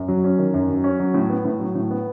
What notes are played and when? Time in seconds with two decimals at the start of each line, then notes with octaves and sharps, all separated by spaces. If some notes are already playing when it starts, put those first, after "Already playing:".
Already playing: F#2
0.08 F#3
0.24 C#4
0.38 D#3
0.54 F#2
0.69 F#3
0.84 C#4
1.00 F#3
1.14 A2
1.30 B3
1.45 A2
1.60 F#3
1.75 A2
1.91 B3